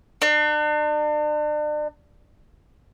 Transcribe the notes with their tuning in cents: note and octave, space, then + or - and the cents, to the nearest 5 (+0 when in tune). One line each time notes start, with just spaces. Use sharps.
D4 +40